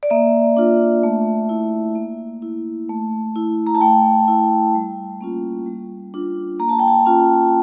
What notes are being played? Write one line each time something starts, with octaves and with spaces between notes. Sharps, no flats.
D5
A#3 E5
D4 F4
A3
E4
A#3
E4
A3
E4
A#5
A5
A3 G5
E4
G3
A#3 C#4 F4
G3
D4 F4
A#3 A#5
A5
G5
A5
C#4 F4